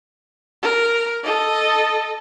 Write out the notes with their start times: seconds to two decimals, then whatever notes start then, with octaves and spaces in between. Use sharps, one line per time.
0.62 A#4
1.23 A4 D#5